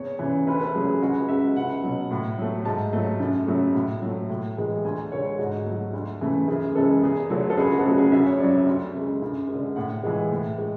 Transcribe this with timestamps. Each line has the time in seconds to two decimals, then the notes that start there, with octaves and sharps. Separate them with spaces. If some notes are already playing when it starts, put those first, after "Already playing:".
Already playing: E2 C#5
0.19 C#3 E3
0.47 D2 B4
0.61 A4
0.74 C#3 F#3 A3 G#4
0.87 G#4
1.02 C#2 F#4
1.28 C#3 G#3 E5
1.56 C#2 F#5
1.83 B2 F#3
2.11 A2
2.38 F#3 A3
2.65 G#2 A5
2.93 F#3 A3
3.20 F#2
3.47 C#3 F#3 A3
3.75 A2
4.02 F#3 A3
4.30 A2
4.57 E3 G#3
4.84 D2 G#5
5.12 D3 G#3 C#5
5.39 G#2 F#4
5.66 F#3 A3
5.93 D2
6.21 C#3 E3 A3
6.48 F#2 G#4
6.76 C#3 E3 G#3 A4
7.03 E2 G#4
7.30 D3 F#3 A3
7.50 A4
7.57 C#2 G#4
7.71 F#4
7.79 A4
7.85 C#3 F#3 A3 G#4
7.98 G#4
8.12 F#2 E5
8.26 C#5
8.39 C#3 F#3 D5
8.53 E5
8.67 D2
8.94 C#3 G#3
9.22 F#2
9.49 G#3
9.54 D3
9.76 A2 F#5
10.03 E3 G#3
10.31 A2
10.58 G#3